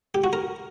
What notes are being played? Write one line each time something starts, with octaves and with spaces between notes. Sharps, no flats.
G4
F#4
A#4